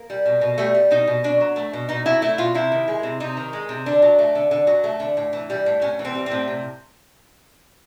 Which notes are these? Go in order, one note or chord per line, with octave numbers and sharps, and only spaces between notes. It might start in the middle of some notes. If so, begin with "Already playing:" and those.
Already playing: A#3
G3
B2
B2
G3 A3
G3
B2 D#4
B2
B2 D4
F#3
A3
B2
B2 D#4
F#3 E4
A3 E4
B2 F4
C3 E4
D#3
G#3
C3
C3 D#4
D#3
G#3
C3
D3 D4
F#3
A3
D3
D3
F#3
A3
D3
A2
E3
G3
A2
A2 C#4
E3
C4
G3
C4
A2
C3